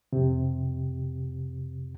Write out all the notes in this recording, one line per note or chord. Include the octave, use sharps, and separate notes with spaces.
F2 C3